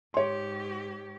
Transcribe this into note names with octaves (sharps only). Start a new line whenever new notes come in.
G#2 G4 C#5 C6